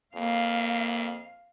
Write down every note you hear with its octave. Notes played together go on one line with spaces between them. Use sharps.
F2 A#3 F5